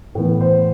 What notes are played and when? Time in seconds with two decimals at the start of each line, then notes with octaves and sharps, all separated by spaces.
0.15 A2 E3 B3
0.41 C5